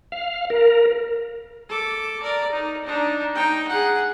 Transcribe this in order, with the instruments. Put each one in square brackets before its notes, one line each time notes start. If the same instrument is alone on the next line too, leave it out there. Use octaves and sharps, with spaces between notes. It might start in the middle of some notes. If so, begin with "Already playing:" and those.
[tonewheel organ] F5
A#4
[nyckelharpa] A4 D6
A#4 D5
D#4
D4 D#4
D#4 G5
G#4 F#5